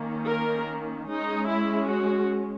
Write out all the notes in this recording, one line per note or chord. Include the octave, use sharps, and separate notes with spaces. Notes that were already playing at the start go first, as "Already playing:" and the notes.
Already playing: D#3 A#3 C#4
A#4
G#3 C#4 D#4
E4
F#4